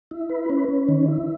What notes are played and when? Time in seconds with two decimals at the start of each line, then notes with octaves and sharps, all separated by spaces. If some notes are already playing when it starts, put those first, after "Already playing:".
0.11 E4
0.29 B4
0.50 C#4
0.68 C#4
0.89 D#3
1.08 E4